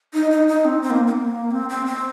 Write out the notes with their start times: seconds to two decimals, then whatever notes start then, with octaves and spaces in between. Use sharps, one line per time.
0.14 D#4
0.31 D#4
0.48 D#4
0.65 C4
0.82 C4
0.90 A#3
1.07 C4
1.11 A#3
1.51 C4
1.69 C4
1.86 C4